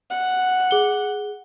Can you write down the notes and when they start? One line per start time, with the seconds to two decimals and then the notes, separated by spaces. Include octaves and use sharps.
0.10 F#5
0.71 G#4 G7